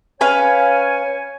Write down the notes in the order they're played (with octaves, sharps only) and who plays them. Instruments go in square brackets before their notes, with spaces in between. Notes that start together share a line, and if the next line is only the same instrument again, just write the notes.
[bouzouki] C#4 B4 F5 [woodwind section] C#5 G#5